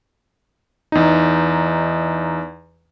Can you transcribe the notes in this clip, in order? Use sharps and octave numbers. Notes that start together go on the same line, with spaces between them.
E2 D#4